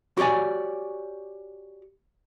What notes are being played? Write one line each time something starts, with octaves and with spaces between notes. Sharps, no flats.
F#4 G4 C#5 D5 G#5